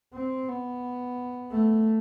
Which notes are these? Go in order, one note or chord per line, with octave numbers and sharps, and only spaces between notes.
C4
B3
A3